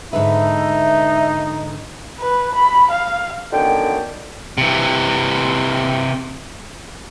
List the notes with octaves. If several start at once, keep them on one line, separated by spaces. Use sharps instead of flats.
G#2 D3 D#4 B4 E5
B4
B5
F5
F#2 D3 D#3 B3 G5
C3 E3